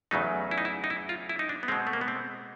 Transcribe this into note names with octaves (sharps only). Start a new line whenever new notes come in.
E2 C#3 F#3 A3 D#4
E4
D#4
E4
D#4
E4
F4
E4
D#4
D4
B3
B2 G#3 C4
A3
A#3
B3
C4